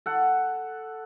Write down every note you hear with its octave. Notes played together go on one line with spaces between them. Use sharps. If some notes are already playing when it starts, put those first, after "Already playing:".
A4 F#5